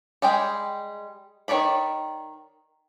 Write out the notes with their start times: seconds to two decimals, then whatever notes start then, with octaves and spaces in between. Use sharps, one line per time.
0.22 G3 G#3 G#4 G5
1.48 D#3 F3 C#5 D5 B5